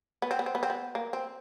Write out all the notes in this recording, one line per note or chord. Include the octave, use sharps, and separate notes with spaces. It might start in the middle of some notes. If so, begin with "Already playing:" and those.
B3
C4
B3
C4
B3
C4
B3
A#3
C4